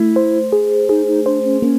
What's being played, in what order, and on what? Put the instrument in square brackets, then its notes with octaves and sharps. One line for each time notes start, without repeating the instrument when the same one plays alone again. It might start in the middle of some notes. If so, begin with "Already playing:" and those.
Already playing: [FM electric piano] A3 [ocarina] E4
[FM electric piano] C5
G#4
[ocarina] D#4 [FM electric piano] G#4
[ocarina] D#4
[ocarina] D4 [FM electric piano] C5
[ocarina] C#4
[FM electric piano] A#3 [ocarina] C#4